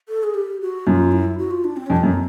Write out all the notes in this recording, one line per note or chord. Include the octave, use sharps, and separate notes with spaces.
A4
G#4
G4
F#4
F#2 F4
E4
F#4
F4
D4
C4
F2 C#4
C4
F#2